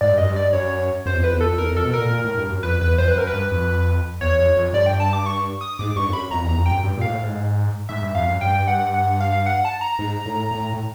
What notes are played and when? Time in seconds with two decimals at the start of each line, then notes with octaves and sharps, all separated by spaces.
0.01 G#2 D5
0.10 G2
0.18 F#2 D#5
0.29 G2
0.36 D5
0.53 F#2 C#5
1.06 F#2 C5
1.14 E2
1.19 F2
1.24 B4
1.33 E2
1.41 F2 A4
1.58 E2 A#4
1.71 F2
1.77 A4
1.85 B2
1.94 A#2 A#4
2.11 A#2
2.25 A2
2.37 G2
2.50 F#2
2.63 F2 B4
2.81 E2 B4
2.98 F2 C5
3.08 B4
3.16 F#2 A#4
3.27 B4
3.33 G2
3.51 F2
4.21 E2 C#5
4.38 F2
4.56 F2
4.73 G2 D5
4.86 G5
5.00 A5
5.13 D6
5.26 C#6
5.61 D#6
5.79 G#2 D6
5.96 G2 C#6
6.09 F2
6.13 F#2 B5
6.31 F2 A#5
6.44 E2
6.49 A#5
6.58 F2
6.66 G5
6.71 F#2
6.83 G2
6.97 A#2
7.01 G#2 F5
7.10 A2
7.23 G#2
7.89 G#2 E5
8.02 G2
8.15 F2 F5
8.28 F#2
8.41 G2 G5
8.68 F#5
8.94 F#5
9.20 F5
9.46 F#5
9.65 A5
9.81 A#5
9.99 G#2
10.26 A2
10.51 A2
10.74 A2